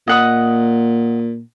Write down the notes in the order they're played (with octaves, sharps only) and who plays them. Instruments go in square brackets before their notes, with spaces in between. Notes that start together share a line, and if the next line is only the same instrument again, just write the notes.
[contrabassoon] A#2 [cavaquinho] D#5 F#5 D#6